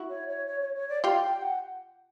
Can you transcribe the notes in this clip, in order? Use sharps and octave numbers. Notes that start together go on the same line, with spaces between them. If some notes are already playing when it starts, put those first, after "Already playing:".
Already playing: E4 F#4
C#5
C#5
C#5
C#5
C#5
D5
F4 G4 F5
G5
F#5